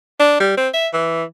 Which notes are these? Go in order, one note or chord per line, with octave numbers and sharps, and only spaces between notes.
D4
G3
C4
E5
E3